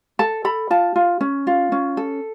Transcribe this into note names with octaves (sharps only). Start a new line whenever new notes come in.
A4 A5
A4 B5
F4 A5
F4
C#4
F4
C#4
A4